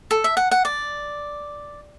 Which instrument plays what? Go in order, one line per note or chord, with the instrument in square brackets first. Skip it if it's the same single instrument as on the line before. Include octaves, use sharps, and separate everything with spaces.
[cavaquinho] A4
E5
F#5
F#5
D5